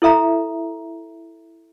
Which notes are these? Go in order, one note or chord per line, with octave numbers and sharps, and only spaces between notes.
E4 A4 E5 A#5